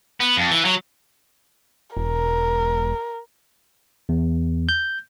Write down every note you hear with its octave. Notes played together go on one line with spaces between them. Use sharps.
B3
F2
E3
F#3
E1 A#4
E2
G6